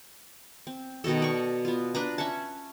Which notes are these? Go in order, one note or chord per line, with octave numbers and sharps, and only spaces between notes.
C4
B2 D#3 F#4 A4
D5 C#6
B3 F4
D4 B4 A#5
C#4 E5 F#5 A5